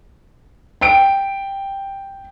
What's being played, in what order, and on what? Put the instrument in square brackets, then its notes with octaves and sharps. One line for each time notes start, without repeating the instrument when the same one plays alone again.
[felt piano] G5 D7